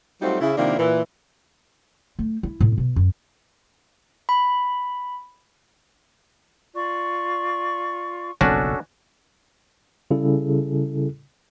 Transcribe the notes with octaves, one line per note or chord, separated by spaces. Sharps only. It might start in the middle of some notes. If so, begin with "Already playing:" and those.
F#3 G3 A3 C4 D#4 F4
C#3 E4
C3 D#3 F3 A#3 D4 E4
A#2 E3
A3
E4
A2
B2
F#2
B5
F4 D5 C#6
F#1 B1 F2 C#4 D4 F#4 A4
C#3 G3 E4 G#4 A4